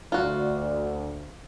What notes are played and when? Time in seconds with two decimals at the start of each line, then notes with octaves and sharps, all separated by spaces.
0.12 D2 F4 F#4